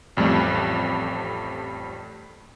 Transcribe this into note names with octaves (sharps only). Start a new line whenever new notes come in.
A1 F2 G3 A3